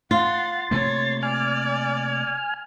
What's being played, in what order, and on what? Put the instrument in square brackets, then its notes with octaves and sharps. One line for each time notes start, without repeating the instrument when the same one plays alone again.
[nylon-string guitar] F4 [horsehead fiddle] F5 F#5 [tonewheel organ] C6 A6
[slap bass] C3 A3 A#3 [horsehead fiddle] C#5
[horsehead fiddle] D5 [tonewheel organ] G#5 F6